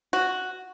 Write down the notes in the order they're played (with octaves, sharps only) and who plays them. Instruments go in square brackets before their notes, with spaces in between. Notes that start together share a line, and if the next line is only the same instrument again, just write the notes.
[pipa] F#4